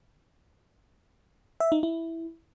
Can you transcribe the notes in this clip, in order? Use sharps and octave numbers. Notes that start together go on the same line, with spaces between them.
E5
D#4
E4